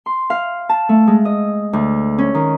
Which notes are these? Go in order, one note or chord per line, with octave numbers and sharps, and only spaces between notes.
C6
F5
A5
A3
G#3
D#5
D2
C#4
D#3